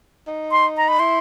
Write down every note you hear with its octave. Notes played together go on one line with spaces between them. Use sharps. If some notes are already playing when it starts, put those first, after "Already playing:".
D#4
C6
A#5
B5
E4 C6